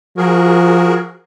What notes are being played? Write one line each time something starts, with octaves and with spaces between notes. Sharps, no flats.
F3 F#4 G#4 A#4